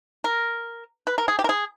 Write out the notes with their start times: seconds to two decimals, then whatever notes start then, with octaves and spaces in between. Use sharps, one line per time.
0.24 A#4
1.07 B4
1.18 A#4
1.28 G#4
1.39 G4
1.44 A#4
1.49 G#4